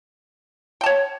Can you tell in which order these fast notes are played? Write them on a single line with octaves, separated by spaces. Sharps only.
G5 A5 C#5